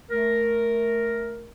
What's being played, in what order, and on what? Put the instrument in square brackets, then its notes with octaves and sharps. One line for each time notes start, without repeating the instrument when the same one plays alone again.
[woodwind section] A3 A#4